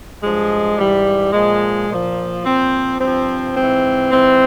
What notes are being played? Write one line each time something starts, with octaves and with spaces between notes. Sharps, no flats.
G2 F3 G#3
G#2 E3 G3
A#2 F3 G#3
A#2 F3
A#2 F3 C4
G2 F3 C4
G#2 E3 C4
G#2 E3 C4